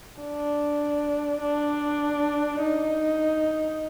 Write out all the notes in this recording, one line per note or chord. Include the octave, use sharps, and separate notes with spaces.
D4
D4
D#4